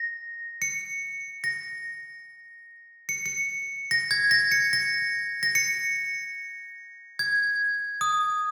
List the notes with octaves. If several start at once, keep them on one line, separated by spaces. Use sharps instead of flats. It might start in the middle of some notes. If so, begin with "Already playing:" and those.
Already playing: A#6
C#7
A#6
C#7
C#7
A#6
G#6
A#6
C#7
A#6
A#6
C#7
G#6
D#6